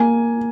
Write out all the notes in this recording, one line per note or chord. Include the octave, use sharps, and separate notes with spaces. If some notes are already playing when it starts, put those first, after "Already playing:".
Already playing: A#3 G#5